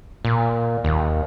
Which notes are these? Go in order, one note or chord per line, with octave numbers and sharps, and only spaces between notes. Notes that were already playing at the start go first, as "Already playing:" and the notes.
A#2
D#2